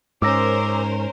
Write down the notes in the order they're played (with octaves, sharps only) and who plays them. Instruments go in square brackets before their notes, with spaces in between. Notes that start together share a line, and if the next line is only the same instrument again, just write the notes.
[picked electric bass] G#2 [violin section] C#4 A#4 C5 [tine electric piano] D6 E6 A#6